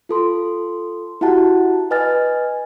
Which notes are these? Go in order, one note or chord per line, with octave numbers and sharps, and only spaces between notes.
F4 A4 C6
E4 F#4 G4 F#5 A5
B4 D#5 G#5 F6 A6